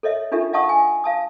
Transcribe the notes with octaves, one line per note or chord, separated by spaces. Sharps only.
A4 C#5 D#5 E5
D4 D#4 F4 G4 A4 E5
D#5 F5 F#5 A5 C#6 D#6
G#5
F5 A5 D#6